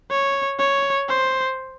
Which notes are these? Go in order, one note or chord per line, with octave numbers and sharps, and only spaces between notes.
C#5
C#5
C5